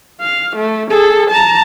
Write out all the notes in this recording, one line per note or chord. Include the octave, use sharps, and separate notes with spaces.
F5
A3
G#4 A4
A5 A#5